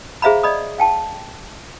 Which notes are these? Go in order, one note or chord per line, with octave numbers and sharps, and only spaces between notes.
G#4 C5 E5 F5 A#5 B5
D5 D#5 B5 D#6
F5 G5 A5